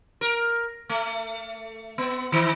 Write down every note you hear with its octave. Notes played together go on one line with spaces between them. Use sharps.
A#4
A3
B3
D#3